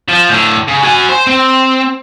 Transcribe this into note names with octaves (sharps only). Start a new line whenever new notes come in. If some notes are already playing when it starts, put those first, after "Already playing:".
F3
A2 D3
C#3
F#4 G#5
C5
C4